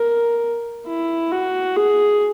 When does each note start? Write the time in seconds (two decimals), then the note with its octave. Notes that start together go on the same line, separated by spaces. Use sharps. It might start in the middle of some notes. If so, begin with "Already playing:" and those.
Already playing: A#4
0.88 E4
1.32 F#4
1.76 G#4